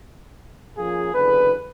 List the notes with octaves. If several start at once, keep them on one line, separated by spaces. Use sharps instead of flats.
F3 A#3 C#4 F4 G#4
F#1 E2 D3 G#4 B4